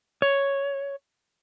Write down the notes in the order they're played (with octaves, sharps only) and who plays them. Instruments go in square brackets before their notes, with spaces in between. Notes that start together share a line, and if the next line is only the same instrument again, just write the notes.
[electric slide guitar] C#5